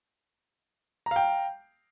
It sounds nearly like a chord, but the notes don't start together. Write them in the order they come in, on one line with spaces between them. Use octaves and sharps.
A#5 F5 G5